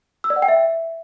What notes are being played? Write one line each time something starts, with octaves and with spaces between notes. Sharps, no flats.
E6
D5
F#5
G5
E5